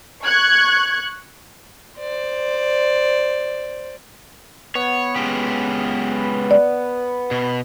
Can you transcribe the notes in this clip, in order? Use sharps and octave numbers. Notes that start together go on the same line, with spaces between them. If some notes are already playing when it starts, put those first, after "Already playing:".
C#6 F#6 G#6
C5 D5
B3 C#5
G#3 C#4 G4
D5
B2